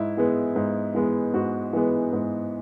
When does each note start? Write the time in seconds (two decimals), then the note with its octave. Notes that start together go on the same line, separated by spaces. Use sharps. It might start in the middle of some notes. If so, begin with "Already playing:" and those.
Already playing: G#2 E4
0.17 E3 G#3 B3
0.56 G#2
0.94 E3 G#3 B3
1.34 G#2 F#4
1.73 E3 G#3 B3
2.13 G#2